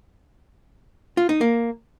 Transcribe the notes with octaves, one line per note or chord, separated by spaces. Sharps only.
F4
D#4
A#3